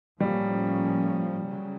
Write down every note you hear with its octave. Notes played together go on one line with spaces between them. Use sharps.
A2 F3 G3 A#3 C#4
C#3 F#3